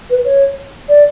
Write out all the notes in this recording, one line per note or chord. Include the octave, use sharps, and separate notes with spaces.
B4
C#5
D5